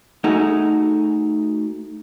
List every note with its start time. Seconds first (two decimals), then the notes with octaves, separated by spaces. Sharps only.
0.24 A3 D#4 F#4 G#4